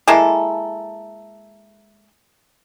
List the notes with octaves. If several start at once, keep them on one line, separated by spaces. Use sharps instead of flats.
G#3 A#3 E4 A4